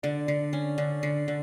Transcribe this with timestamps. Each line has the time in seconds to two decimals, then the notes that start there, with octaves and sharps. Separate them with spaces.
0.03 D3 D5
0.28 D3
0.53 C#4
0.78 D3
1.03 D3
1.28 D3